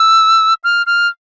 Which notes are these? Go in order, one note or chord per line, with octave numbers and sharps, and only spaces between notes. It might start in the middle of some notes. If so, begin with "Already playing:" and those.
Already playing: E6
F6
F6